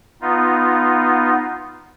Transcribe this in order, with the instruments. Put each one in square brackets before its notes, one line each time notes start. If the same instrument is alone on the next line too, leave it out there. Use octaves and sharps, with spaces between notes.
[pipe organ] B3 D#4 F4